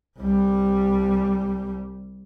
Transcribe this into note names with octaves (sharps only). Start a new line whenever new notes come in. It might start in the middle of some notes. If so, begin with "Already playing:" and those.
C2 G3